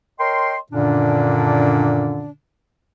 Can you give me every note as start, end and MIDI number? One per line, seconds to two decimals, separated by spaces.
0.20 0.56 70
0.20 0.56 73
0.20 0.56 75
0.20 0.56 79
0.20 0.56 84
0.72 2.30 42
0.72 2.30 46
0.72 2.30 50
0.72 2.30 51
0.72 2.30 61
0.72 2.30 62